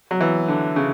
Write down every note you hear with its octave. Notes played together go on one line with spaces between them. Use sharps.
F#3
E3
D3
C#3